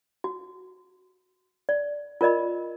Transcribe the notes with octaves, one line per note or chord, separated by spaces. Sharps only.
F#4
D5
F4 A#4 D5 D#5 B5